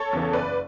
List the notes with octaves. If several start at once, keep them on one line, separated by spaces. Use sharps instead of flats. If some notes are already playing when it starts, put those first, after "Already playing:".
Already playing: A4 C#5
E2 C#3 E3
F#1 B4 D5